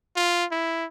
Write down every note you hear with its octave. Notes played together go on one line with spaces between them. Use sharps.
F4
E4